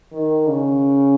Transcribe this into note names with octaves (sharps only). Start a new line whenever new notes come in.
D#3
C#3